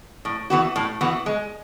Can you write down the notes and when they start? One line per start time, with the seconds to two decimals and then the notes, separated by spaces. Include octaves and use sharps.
0.25 A2
0.50 E3 B3 F#4
0.76 A2
1.01 E3 B3 F#4
1.26 G#3